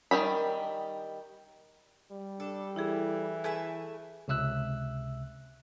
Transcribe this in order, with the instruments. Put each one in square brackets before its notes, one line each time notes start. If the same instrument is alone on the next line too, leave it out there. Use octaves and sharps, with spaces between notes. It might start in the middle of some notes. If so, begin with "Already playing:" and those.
[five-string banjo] D#3 E3 G3 B5
[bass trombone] G3
[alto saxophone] D4 [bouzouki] A4
[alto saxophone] E3 [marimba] E4 G4 G#4
[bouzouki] A3 B4 E5 [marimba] G#4 G#5
[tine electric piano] C#2 C3 E5 E6 F#6